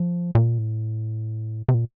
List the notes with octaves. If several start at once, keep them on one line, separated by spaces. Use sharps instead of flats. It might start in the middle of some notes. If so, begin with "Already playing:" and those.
Already playing: F3
A#2
A2
C3
A#2